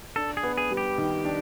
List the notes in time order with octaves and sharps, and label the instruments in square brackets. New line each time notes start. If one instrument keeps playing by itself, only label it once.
[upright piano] D4 [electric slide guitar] A4
[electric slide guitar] G#4
[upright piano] B3
[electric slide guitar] G#4
[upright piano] G3
[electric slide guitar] G4
[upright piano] D#3
D4